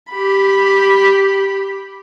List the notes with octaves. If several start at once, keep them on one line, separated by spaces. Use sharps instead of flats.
G4 B5